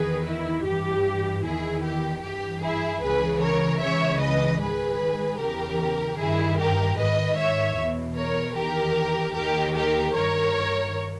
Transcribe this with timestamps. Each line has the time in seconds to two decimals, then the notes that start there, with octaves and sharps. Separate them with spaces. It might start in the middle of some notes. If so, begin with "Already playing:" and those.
Already playing: E2 D#3 G#4 B4
0.25 E4
0.64 G2 E3 G4
1.43 E2 D#3 E4 G#4
1.83 G4
2.22 G2 E3 G4
2.63 E4 G#4
3.02 C#2 C#3 E3 G#4 B4
3.42 A#4 C#5
3.81 C#2 C#3 E3 C#5 E5
4.21 B4 D#5
4.60 G#2 D#3 G#4 B4
5.39 E2 C#3 E3 G4 A#4
6.19 G2 D#3 E4 G#4
6.58 G4 A#4
6.98 G#2 D#3 B4 D#5
7.37 C#5 E5
7.77 E2 B2
8.17 A#4 C#5
8.56 E2 D#3 G4 A#4
9.36 D#2 D#3 G4 A#4
9.75 G4 A#4
10.15 G2 D#3 A#4 C#5